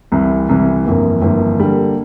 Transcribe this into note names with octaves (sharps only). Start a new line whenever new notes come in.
C2 C3 E3
C2 C3 E3
G1 F2 E3 A#3
G1 F2 E3 A#3
D3 G3 A#3